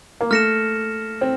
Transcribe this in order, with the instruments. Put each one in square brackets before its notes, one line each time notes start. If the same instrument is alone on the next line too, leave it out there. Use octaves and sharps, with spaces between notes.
[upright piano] A#3
[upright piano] A3 [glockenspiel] F6 A#6 C#7 E7
[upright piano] C4